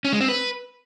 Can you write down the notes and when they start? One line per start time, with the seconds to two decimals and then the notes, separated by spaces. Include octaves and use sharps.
0.05 C#4
0.13 G#3
0.21 C4
0.29 B4